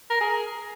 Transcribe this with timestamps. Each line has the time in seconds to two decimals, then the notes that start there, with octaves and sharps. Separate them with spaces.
0.10 A#4
0.20 G#4